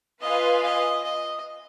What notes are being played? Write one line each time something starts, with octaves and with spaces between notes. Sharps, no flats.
F4 B4 D#5 F5 G#5
D#5
D#5